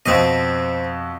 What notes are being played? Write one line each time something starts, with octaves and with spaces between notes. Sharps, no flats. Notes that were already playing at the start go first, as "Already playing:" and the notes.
F2 B2 C4 D#5